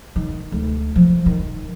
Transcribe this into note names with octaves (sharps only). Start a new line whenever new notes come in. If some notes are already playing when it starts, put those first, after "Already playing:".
D#3
D2
F3
D#3